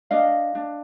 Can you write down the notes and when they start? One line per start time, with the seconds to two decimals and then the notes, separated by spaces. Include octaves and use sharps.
0.11 D4 D#5 F5
0.55 D4